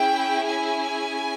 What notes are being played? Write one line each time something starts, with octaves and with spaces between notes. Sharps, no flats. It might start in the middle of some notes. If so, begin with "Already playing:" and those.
Already playing: C#4 E4 G#4 G5
G#5